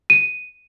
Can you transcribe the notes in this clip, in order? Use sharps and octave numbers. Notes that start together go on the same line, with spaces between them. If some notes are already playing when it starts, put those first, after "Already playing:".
D#7